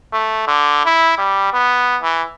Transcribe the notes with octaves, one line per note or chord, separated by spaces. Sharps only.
A3
D3
E4
G3
B3
E3